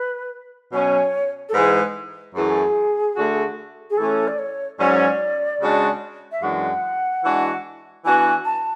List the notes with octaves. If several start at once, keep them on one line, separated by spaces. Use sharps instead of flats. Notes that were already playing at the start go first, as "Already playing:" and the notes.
Already playing: B4
B2 F#3 C#4 C#5
A4
G#2 E3 G#3 B4
F#2 E3 A3 G#4
D3 A3 D4 F#4
G#4
E3 A3 C#4 A4
D5
C#5
G#2 F#3 C#4 D5
C#3 G#3 D4 F#4
E5
F#2 E3 G#3 D4 F#4 F#5
E3 G#3 D4 F#4
E3 B3 D4 F#4 G#5
A5